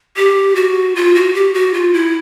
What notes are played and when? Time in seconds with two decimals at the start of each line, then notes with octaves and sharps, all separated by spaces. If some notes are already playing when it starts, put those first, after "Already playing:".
0.17 G4
0.56 F#4
0.95 F4
1.15 F#4
1.35 G4
1.54 F#4
1.74 F4
1.94 E4